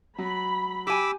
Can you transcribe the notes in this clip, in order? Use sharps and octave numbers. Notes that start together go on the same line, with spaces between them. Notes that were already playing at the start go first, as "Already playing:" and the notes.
F#3 B5
G4 G#5 B5 D6 E6